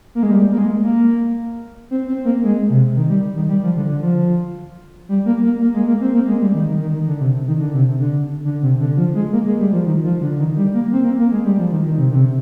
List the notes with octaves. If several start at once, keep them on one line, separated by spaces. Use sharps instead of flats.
A#3
G#3
G3
A#3
G#3
A#3
C4
C4
A#3
G#3
C3
D#3
G3
D#3
G3
F3
D3
D3
F3
G3
A#3
A#3
A#3
G#3
A#3
C4
A#3
G#3
G3
D#3
D#3
D#3
D#3
D3
C3
D#3
D3
C3
D3
D3
C3
D3
F3
G#3
A#3
G#3
G3
F3
D#3
F3
D3
D#3
G3
A#3
C4
A#3
A#3
G#3
G3
F3
D#3
D#3
C3
D3
C3